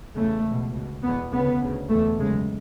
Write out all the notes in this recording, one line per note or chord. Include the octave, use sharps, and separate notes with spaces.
E2 C#3 A3
C#2 B2
C#2 B2
E2 B2 B3
D2 C#3 B3
D2 C#3
E2 B2 A3
F#2 C#3 G#3